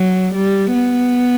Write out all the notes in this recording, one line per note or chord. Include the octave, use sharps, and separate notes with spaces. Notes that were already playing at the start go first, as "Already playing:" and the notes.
Already playing: F#3
G3
B3